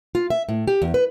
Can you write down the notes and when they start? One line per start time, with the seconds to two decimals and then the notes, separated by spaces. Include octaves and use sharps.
0.15 F4
0.30 E5
0.49 A2
0.67 G4
0.82 E2
0.94 B4